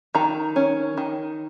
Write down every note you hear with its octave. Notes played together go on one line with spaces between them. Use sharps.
D#3 A#5
C#4
D#3